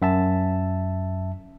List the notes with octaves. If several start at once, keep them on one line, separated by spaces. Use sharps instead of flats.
F#2 E5 A5